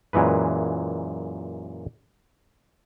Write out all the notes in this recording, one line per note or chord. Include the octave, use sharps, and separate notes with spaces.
F#2 A#2 E3 G#3 B4